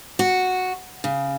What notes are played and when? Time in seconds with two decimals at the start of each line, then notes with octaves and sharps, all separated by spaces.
0.19 F#4
1.04 C#3